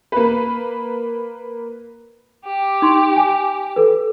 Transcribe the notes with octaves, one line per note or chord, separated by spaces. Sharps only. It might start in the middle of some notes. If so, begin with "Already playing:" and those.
A#3 B4
G4
D#4 C6 C#6
G#5
A4 B4